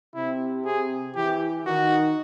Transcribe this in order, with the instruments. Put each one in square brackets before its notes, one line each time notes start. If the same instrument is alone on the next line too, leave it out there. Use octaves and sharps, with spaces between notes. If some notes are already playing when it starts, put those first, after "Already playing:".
[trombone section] C3 C4 [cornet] E4
[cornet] G#4
[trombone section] E3 E4 [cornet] G4
[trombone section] D#3 D#4 [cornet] F#4